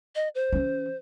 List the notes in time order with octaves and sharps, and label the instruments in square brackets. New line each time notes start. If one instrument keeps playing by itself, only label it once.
[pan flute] D#5
C5
[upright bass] E3 C#4